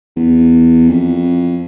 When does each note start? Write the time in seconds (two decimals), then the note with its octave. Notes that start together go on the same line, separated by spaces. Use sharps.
0.17 E2
0.88 F2